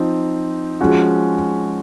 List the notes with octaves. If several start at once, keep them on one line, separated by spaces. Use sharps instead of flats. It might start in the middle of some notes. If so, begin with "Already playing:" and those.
Already playing: F3 C4 D#4
F3 G#3 C#4 F#4